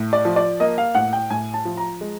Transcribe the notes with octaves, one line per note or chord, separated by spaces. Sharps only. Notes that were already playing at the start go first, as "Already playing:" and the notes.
Already playing: A2
D5
F3
D5
A#3 D#5
F5
A2 F#5
G5
A2 G#5
A5
F3
A#5
G#3